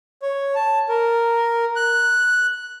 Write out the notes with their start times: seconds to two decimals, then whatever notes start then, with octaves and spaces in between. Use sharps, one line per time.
0.22 C#5
0.55 A5
0.89 A#4
1.76 F#6